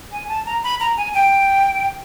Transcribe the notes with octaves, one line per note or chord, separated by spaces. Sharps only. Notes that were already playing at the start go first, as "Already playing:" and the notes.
G#5
A5
A#5
B5
A#5
G#5
G5